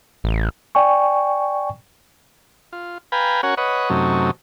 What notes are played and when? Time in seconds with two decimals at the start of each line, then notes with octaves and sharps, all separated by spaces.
0.24 A1
0.75 D5 G5 G#5 C#6
2.73 F4
3.12 B4 F5 G5 G#5 A#5 B5
3.43 C#4 F#4 A#4 C#5 F#5 G#5
3.57 B4 C#5 D#5 F#5
3.90 F#2 C3 F#3 A3 C#4 D#4